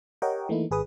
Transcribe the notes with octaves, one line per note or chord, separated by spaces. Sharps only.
G4 A#4 C#5 D#5 F#5 G5
E3 A3 A#3 D#4 E4
G#1 G#4 B4 D#6